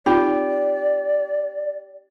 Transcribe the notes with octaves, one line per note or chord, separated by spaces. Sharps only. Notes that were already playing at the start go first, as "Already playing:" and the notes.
C4 D#4 F4 G4 D5